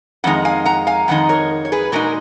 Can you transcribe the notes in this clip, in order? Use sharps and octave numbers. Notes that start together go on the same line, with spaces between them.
F2 D#3 G#3 D#4 F#5
F5 G#5
F#5 A#5
F5 G#5
F2 D#3 G#3 D#4 F#5
A#4 C#5
C#5
G#4 B4
A#2 G#3 D#4 F#4 A#4